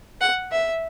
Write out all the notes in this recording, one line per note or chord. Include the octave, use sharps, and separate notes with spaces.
F#5
E5